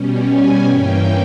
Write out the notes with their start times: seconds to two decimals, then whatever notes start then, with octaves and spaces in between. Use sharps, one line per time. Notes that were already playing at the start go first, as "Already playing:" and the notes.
Already playing: B2 G3 C#4
0.27 G#5
0.68 G2 E3 A#3 C#4 G5